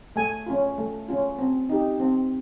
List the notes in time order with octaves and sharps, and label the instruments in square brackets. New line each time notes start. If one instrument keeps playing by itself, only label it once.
[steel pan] A3 G#5
C#4 F4
A3
C#4 F4
C4
D#4 G4
C4